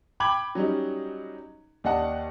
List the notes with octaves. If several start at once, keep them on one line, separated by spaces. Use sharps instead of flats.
G5 B5 D6 G#6 F#7
F#3 G3 C#4 D#4
D#2 D5 D#5 F#5 A5